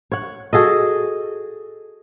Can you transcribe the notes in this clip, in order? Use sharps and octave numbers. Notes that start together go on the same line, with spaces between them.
C#5 F#5
F#4 G#4 A4 D#5